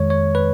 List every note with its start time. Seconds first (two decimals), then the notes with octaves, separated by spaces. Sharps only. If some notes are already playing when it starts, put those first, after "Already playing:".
Already playing: F2 D#3 G#3 C#5
0.10 C#5
0.35 B4